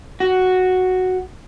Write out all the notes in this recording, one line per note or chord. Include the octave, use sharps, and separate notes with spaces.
F#4